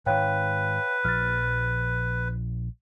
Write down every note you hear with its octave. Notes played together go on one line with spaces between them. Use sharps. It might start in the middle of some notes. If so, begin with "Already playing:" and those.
G#2 D#3 B4 C#5 F5 G5
A#1 F3 F6 A6